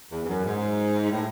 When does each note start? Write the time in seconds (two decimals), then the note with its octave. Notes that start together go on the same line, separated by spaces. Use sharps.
0.11 E2
0.23 E2
0.28 F#2
0.44 G#2
1.11 A2